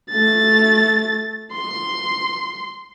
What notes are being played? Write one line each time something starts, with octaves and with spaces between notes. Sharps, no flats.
A3 A6
C6